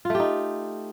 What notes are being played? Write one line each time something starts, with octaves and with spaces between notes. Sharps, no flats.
A3 D#4 F4 G4